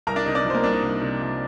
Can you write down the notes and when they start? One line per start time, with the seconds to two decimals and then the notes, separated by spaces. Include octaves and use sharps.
0.07 C2 A#4 A#5
0.16 D4 D5
0.26 C3 D#4 D#5
0.35 D4 D5
0.45 F3
0.50 C5
0.54 A#3 A#4
0.64 C2 D4
0.73 D#4
0.82 C2
1.01 C3
1.20 F3